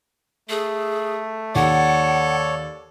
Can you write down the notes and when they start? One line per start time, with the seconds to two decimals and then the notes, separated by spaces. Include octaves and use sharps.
0.49 A3 G#4
1.55 D#2 A4 C#5 D5 F#5